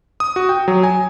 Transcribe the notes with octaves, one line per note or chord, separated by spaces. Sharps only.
D#6
F#4
G5
F#3
G#5